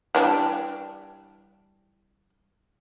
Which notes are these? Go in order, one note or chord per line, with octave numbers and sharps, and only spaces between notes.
E3 G3 D4